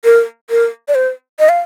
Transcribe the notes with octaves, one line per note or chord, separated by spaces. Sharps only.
A#4
A#4
D5
C5
D#5
F5